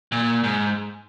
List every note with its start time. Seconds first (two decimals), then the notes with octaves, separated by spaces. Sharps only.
0.12 A#2
0.44 G#2